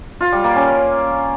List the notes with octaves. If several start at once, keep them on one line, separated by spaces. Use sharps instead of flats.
F4
G3
A#3
C#4